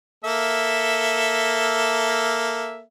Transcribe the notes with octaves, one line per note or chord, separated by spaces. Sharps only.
A#3 A4 E5